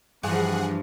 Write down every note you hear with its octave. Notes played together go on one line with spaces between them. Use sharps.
G2 E3 F3 G#4 F#5 F#6